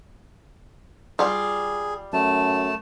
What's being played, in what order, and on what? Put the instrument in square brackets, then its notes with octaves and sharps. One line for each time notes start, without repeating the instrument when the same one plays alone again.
[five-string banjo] G3 F4 [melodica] G#4
[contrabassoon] F#2 [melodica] A3 A5